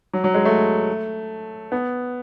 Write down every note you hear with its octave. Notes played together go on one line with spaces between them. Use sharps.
F#3
F#3
G#3
A3
B3